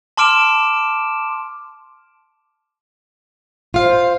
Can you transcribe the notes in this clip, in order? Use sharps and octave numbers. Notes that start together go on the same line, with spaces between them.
A5 C6 D6 F6 D7 E7
F4 C5 F5